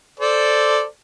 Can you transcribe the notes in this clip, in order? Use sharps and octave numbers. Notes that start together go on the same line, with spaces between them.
A4 C5 D5